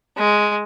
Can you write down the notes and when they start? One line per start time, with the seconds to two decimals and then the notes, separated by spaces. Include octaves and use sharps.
0.17 G#3